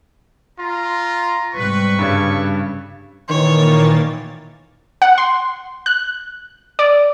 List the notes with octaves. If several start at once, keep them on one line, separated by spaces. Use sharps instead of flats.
F4 A#5
G#2 C3 G3 B4 C#6
G2 C#3 A4 B4 C#5
A#2 D#3 E3 A#3 C#5 A6
F#5
C6
F#6
D5